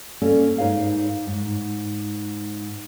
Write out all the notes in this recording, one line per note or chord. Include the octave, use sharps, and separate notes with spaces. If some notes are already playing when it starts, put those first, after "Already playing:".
A#3 C#4 A4 D5
G#2 D#4 B4 C#5 F5
G#2